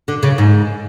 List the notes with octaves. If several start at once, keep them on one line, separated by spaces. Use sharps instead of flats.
D3
C#3
G#2